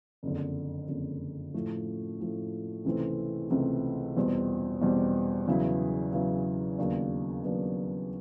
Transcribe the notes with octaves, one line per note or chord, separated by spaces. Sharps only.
F#1 F2 D3
F#1 F2 D3
A2 F3 A3
A2 F3 A3
C#2 C3 E3 A3 C4
C#2 C3 E3 A3 C4
E2 B2 G3 C4
E2 B2 G3 C4
E2 C#3 F#3 B3 E4
E2 C#3 F#3 B3 E4
D#2 C#3 F#3 B3 D4
D#2 C#3 F#3 B3 D4